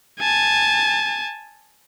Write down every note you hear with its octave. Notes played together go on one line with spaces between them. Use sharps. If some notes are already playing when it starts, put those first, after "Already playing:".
G#5 A5